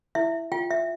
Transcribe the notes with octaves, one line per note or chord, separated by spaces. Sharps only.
E4 E5
F4 G5
E5